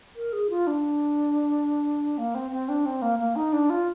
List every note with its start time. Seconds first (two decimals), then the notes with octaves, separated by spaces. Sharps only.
0.16 A#4
0.32 G#4
0.50 F4
0.67 D4
2.18 A#3
2.34 C4
2.51 C4
2.68 D4
2.85 C4
3.02 A#3
3.18 A#3
3.36 D#4
3.52 D4
3.70 F4